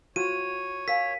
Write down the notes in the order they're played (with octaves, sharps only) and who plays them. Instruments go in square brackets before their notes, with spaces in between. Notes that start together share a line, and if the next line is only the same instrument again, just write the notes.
[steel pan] F4 F#4 [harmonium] C#5 [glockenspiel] D#7
[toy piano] A#4 F5 G#5 [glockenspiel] B6